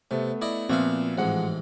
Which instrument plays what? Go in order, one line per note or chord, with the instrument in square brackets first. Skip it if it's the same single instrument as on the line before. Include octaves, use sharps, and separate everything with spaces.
[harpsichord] C3 [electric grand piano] A3 B3 A4
[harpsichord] E4 D5 D#5
[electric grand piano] A#2 F3 B3 [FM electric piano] C4 [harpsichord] F#4 E5 F5
[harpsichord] A1 G#2 [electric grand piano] F3 G#3 F#5